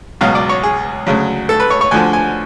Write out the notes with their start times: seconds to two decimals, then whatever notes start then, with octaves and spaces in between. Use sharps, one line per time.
0.21 C#2 B2 F#3 F5
0.35 D5
0.49 C#5
0.63 G#4
1.07 D2 C#3 F#3
1.49 A4
1.60 B4
1.70 C#5
1.81 C#5
1.91 D2 D3 F3 G#5
2.13 G#5